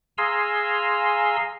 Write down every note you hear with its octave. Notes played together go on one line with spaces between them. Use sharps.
G#4 F5 G#5 A#5 C6 E6